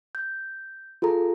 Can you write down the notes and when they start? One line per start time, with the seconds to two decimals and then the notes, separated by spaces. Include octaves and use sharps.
0.15 G6
1.02 F4 G#4 A4 A#5